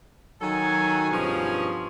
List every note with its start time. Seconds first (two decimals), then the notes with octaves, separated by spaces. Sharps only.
0.41 D#3 F#3 A4 G#5
1.10 G2 B2 F3 C#4 G#4